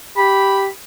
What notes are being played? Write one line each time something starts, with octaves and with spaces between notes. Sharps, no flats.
G4 B5